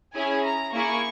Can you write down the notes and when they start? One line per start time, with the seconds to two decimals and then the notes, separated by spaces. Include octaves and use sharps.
0.14 C#4 E4 G#4 G#5
0.44 A#5
0.74 A#3 E4 G#4 C#6